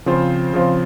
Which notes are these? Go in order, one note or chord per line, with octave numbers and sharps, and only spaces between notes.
C#3 F3 C4 F4 C5
C#3 F3 C4 F4 C5